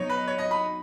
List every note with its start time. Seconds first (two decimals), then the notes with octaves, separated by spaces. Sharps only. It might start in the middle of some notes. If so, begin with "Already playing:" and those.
Already playing: B2 F#3 D#4 C#5
0.10 B4
0.28 C#5
0.38 D#5
0.51 B5